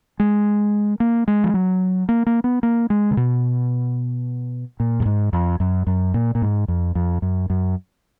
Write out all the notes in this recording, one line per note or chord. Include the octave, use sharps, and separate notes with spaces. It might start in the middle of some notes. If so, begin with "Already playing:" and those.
G#3
A#3
G#3
F3
F#3
A#3
A#3
B3
A#3
G#3
C#3
B2
A#2
F#2
G#2
F2
F#2
F#2
A#2
A#2
G#2
F2
F2
F#2
F#2